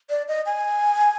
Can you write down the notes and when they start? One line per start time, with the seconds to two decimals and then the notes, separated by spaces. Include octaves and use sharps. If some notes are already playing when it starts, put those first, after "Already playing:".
0.10 D5
0.28 D#5
0.46 G#5